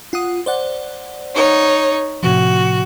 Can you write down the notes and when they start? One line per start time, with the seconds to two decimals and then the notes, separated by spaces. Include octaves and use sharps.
0.13 F4 F#5 D#6
0.46 C5 D5 F#5
1.34 D#4 C#5
2.23 A2 C3 F3 F#4